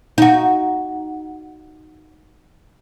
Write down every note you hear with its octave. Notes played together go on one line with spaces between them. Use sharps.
D#4 F#4